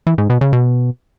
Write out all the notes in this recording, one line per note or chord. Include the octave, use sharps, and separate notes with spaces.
E3
G#2
B2
C#3
B2